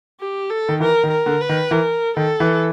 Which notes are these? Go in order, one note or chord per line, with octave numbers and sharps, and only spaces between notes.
G4
A4
D#3
E3 A#4
D#3
A#4
D3
B4
D#3
E3 A#4
D#3 A4
E3